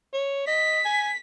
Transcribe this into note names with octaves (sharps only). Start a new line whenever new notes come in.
C#5
D#5 B6
G#5